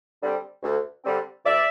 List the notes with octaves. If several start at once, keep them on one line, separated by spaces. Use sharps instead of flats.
D3 G3 C4
D2
D3 G3 C4
D2 D5 E5